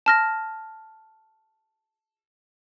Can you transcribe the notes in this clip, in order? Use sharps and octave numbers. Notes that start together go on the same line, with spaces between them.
A5 F6 A#6